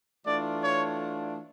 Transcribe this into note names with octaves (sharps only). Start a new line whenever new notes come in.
E3 A3 D4 F4 D5
C#5